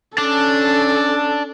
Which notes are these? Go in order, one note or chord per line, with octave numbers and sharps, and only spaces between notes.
C#4 D4 A4